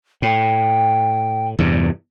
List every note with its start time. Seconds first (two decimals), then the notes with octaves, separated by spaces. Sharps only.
0.22 A2 G5
1.59 E2 G2 C3